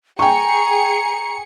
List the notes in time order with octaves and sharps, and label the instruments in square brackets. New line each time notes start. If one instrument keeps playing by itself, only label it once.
[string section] G#4 C#7 [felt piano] G5 C#6 [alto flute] A#5